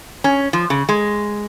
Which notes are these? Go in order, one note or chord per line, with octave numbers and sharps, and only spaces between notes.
C#4
F3
C#3
G#3